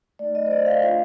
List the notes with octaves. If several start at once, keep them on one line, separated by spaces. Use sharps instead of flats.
A3 D#4 D5
D#5
C5
D5
F5
A3 D4 F4 F5